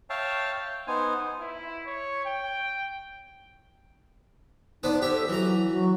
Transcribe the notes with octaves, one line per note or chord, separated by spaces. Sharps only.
C#5 E5 F5 G5 A5
G5
B3 D#4 C5 G#5
E4
C#5
G5
B3 D4 D#4 C5
G4 C5 E5
A4
E3 F#3 A#5
F#3